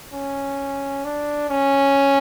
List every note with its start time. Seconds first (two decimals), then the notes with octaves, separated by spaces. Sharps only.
0.13 C#4
1.05 D4
1.50 C#4